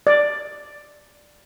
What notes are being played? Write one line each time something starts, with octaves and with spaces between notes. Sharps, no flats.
D5